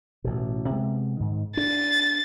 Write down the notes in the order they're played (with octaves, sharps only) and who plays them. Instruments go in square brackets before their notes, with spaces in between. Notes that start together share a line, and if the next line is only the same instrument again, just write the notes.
[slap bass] A1 B2
C3 G#3 B3
G#2 D#3
[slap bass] D4 [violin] A6